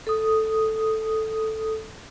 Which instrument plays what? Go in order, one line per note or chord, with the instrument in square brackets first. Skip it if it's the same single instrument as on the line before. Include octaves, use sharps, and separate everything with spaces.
[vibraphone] A4 D#6